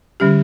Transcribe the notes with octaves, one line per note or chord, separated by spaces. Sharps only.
D3 G3 C#4 G4